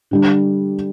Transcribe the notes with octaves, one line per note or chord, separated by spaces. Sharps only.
D3 G3 D4